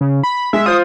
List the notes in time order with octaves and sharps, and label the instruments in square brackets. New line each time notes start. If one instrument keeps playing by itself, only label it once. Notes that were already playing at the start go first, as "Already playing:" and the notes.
[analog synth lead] C#3
B5
[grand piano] G#3 [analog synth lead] E5
[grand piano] F4 C5 [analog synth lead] D#6